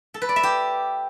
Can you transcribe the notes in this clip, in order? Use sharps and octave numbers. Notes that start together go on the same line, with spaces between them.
A4
B4
D5
E5
G4